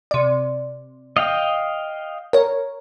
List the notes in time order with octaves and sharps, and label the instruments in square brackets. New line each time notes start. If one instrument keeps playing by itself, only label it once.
[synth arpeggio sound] C3 D5
[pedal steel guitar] D#5 F5 G5
[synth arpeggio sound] A#4 C#5